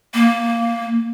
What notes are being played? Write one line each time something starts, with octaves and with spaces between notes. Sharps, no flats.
A#3